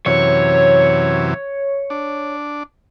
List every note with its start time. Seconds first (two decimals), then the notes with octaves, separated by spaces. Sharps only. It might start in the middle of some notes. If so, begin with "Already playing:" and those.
0.06 F#2 C3 E3 C#5
1.90 D4